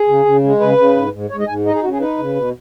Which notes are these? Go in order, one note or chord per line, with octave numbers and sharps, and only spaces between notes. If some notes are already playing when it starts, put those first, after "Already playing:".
Already playing: G#4
C#3
C#3
G#3
C#3 B4
C#3
G#2
G#2
G#2 C#5
D#5
G#2 G#5
D#4 D#5
G#4
C#3 F#4
G#4
D#4 B4
C#3
B2